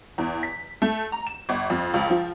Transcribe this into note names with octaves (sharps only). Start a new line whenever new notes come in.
E2
B6
A3
A#5
E7
G1
F2
C#2
F3